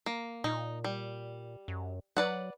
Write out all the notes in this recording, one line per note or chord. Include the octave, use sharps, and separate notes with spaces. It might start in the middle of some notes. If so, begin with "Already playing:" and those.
A#3
A#2 D#4
G3
F#2
F#3 B4 D5 F#5